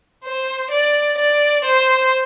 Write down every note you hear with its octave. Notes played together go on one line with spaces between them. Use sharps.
C5
D5
D5
C5